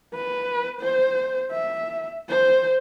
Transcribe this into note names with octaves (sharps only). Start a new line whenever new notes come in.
B4
C5
E5
C5